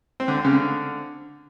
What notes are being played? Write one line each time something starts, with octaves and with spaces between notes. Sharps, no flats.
C4
D3
C4
C#3
D3